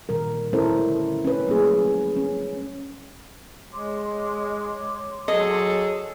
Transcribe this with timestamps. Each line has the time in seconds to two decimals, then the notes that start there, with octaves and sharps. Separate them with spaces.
0.09 A#2 D#3 G3 A#4
0.53 A3 C#4 E4 A4 A#4 C5
0.73 D3
1.25 C#4 B4
1.47 F#3 G3 A3 A#3 C#4 G#4
2.17 C#4
3.73 G#3 C#5 C6 D6
5.28 F#3 G#4 A4 D#5